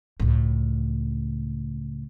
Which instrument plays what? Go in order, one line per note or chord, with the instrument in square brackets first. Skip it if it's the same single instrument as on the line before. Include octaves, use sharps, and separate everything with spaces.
[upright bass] C#2 A2